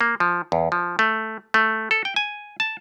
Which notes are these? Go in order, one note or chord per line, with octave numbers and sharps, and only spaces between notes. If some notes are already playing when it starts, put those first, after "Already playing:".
A#3
F3
E2
F3
A3
A3
A4
G5
G#5
A5